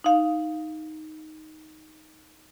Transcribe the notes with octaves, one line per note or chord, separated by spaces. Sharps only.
D#4 F5